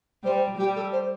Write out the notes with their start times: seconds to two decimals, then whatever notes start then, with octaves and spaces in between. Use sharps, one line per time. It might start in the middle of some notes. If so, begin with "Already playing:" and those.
0.24 G3 C5
0.58 G3 G4
0.75 A4
0.92 C5